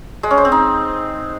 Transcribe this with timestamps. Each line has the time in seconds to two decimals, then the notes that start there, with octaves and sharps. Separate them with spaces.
0.23 G#3
0.30 C#4
0.38 C5
0.45 C4
0.52 D#4